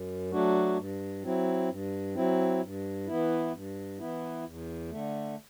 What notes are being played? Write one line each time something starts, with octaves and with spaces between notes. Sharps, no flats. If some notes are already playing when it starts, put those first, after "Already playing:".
Already playing: F#2
F#3 A3 D4 F#4
G2
F#3 C4 E4
G2
F#3 C4 E4
G2
E3 B3 E4
G2
E3 B3 E4
E2
D3 A3